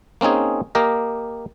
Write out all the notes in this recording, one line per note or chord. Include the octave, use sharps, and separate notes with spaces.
A#3 C4 C#4 D#4 G#4
A#3 G4 A#4 D#5